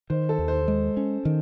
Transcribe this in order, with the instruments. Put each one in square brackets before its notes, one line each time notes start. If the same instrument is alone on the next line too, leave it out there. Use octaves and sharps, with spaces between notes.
[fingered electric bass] D#3 [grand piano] C5
[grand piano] A4
[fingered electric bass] D#2
[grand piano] C5
[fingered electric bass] G#3
C#4
D#3